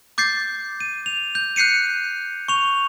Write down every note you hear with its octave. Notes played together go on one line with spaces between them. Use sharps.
D6 G6 A6 C7
D#7
F7
G6
F#6 G6 C7 C#7 D#7
C#6 F7